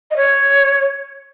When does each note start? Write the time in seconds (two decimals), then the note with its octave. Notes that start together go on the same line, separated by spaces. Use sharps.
0.11 D#5
0.16 C#5